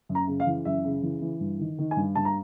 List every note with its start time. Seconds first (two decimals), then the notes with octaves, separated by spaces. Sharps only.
0.09 F#2
0.15 A#5
0.28 C#3
0.40 F5
0.46 E3
0.65 F#2 E5
0.85 C#3
1.02 E3
1.21 E3
1.40 G2
1.60 D#3
1.79 D#3
1.91 G#5
1.97 G2
2.15 G2 A5
2.25 A#5